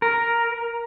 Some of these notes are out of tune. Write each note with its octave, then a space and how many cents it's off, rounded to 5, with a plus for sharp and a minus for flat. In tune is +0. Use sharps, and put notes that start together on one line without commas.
A#4 +5